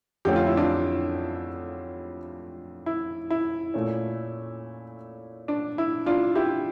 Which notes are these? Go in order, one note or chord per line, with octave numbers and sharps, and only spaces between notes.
F2 D3 A3 C#4 G4
F4
E4
D4 F4
E4
E4
A#2 A3 C#4
D4
E4
D4 F4
E4 G4